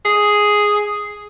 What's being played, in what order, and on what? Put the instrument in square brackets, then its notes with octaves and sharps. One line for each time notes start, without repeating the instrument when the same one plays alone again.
[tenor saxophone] G#4